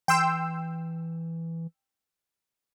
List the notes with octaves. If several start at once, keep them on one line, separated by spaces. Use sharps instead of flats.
E3 G5 C6 E6